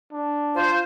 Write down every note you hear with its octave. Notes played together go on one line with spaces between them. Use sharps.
D4
F4 C5